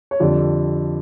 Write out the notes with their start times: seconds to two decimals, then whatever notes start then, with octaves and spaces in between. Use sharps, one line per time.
0.11 C#5
0.20 F2 D3 G3 D5